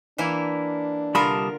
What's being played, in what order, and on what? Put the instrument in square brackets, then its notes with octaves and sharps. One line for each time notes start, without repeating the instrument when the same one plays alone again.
[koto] E3 A#3 E4 [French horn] D4
[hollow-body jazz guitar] C2 B5 [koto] D3 F4 A#4 [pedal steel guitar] G3 A5 D#6